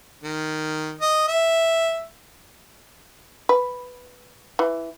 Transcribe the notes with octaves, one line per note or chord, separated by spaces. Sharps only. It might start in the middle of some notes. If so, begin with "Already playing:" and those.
D#3
D#5
E5
B4
E3